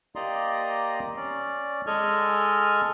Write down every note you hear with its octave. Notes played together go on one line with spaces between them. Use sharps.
A#3 G4 D5 D#5 A#5 C6
C#4 D5
G#3 A4 D#5 G#5 F6